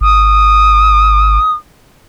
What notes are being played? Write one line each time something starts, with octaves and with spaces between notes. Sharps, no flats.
G#1 D#6